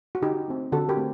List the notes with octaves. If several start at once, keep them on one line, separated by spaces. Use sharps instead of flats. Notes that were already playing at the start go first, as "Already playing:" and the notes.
F#4
D3 D#4 G4
A3 C4
D3 F#4 A4
G4 A#4
A3 C4